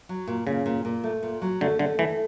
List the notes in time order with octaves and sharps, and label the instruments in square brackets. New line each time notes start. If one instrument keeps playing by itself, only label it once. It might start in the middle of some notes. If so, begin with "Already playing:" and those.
[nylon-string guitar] F#3
A#2
[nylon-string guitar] A#2 [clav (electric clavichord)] C#3
[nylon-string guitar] A#2
A#2
A3
A#2
F#3
[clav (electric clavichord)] D3 [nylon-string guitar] A3
[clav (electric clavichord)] D3 [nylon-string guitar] A3
[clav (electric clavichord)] E3 [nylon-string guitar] A3